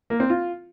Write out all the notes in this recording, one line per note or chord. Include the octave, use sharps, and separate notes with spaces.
A#3
C4
F4